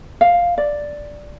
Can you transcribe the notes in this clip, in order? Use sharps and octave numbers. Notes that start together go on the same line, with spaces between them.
F5
D5